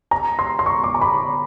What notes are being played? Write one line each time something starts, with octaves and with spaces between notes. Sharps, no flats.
A#5
C6
C6
C#6
D6
A#5
B5